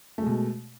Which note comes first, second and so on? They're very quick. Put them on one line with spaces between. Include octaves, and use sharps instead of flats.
A3 G#3 B2